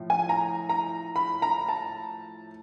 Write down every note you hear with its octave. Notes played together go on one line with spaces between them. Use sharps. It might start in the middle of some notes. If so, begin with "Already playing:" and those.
Already playing: A2 F3
G#5
A#5
A#5
B5
A#5
A5